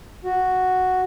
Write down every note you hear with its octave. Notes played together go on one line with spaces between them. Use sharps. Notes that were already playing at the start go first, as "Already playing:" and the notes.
F#4